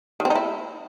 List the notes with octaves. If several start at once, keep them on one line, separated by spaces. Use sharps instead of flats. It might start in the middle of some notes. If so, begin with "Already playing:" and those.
D#3
C4
D#4
E4